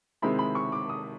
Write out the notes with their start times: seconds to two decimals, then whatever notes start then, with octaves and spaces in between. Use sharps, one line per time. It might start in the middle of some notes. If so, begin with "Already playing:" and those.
0.22 C3 D#3 G#3 C4 E4 B5
0.39 B5
0.55 C#6
0.72 D6
0.89 D#6